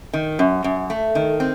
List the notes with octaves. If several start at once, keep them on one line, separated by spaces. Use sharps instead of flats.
D#3
F#2
F#2
A3
D#3
C4